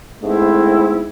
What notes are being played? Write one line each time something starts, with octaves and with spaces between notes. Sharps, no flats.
G#2 A3 B3 C4 E4